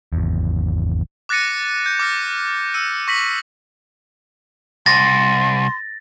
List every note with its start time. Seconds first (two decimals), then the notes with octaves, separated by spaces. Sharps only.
0.13 G#1 E2
1.29 D6 F#6 A6 A#6 C#7 D#7
1.86 G6
1.99 D6 F6 A#6
2.74 E6 C#7 D#7
3.08 C#6 A#6 B6 F#7
4.86 C2 C6 A6 A#6